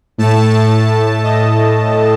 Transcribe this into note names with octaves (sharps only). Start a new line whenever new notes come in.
A2 A3 A5
D#5